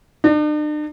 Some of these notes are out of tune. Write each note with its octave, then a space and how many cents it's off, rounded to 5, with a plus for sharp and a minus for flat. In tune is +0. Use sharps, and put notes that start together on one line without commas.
D4 +45